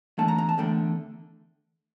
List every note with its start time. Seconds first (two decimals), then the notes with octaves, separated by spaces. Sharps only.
0.18 E2 D3 A3 A5
0.28 A#5
0.38 A#5
0.49 A5
0.58 E2 D3 A3 G5